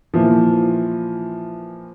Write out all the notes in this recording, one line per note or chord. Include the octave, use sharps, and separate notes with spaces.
A#2 E3 F3